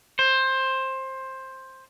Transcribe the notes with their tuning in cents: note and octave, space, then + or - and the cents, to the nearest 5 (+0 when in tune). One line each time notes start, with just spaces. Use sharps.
C5 +15